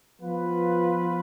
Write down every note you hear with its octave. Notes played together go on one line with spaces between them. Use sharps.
F3 B3 F4 B4